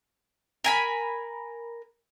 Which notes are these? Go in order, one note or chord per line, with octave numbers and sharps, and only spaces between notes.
A#4 G#5 B5